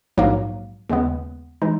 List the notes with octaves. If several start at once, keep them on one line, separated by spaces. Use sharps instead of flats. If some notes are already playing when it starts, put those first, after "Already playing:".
A#1 G#2 F#3 A#3
D#2 C#3 G#3 B3
E3 G#3 D#4